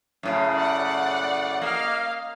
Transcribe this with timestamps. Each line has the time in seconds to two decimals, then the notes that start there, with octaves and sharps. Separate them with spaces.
0.23 F#2 A2 C#3
0.54 D5 F#5
1.62 A#3 D#5 F5